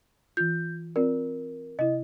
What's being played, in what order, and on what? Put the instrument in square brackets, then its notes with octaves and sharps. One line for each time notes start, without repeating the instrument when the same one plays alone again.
[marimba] E3 F4 [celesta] G6
[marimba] C4 F4 D5 [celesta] A#4
[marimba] C3 E4 [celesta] D#5